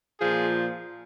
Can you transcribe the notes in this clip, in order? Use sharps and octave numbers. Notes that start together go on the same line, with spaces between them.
A#2 F3 G#4